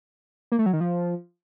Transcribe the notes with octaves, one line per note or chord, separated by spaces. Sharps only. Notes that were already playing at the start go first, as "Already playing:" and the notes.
A#3
A3
F#3
D#3
F3